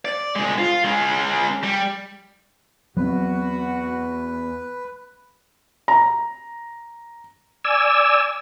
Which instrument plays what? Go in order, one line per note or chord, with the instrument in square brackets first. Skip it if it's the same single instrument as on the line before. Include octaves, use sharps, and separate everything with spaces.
[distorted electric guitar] D5
C2 G#3
F4
G#3 C#4
G3
[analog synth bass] E2 [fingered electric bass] F#3 C4 [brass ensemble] F#4 [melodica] B4
[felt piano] A#5
[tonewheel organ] D5 G#5 E6